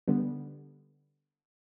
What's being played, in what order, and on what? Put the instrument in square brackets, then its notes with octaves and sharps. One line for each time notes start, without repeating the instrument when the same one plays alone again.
[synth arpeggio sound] D3 G3 B3